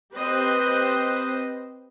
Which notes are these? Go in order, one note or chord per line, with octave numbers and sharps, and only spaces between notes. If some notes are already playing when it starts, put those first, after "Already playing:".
C4 G4 B4 C5 D#5